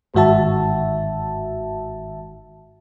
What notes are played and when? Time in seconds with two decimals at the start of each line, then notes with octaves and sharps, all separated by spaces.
0.14 G1 G#2 D#3 F#4 E5 A5